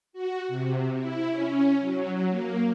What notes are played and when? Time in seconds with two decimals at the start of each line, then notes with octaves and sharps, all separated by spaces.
0.13 F#4
0.48 C3
0.96 E4
1.30 C#4
1.80 F#3
2.30 A#3